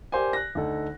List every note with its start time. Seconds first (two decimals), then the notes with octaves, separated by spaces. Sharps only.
0.12 G4 A#4 C5 D5 G#5
0.33 F#6 A#6
0.55 D2 D#4 A4